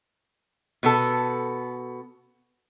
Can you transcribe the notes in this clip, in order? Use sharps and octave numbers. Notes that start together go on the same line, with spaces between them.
B2 B3 A4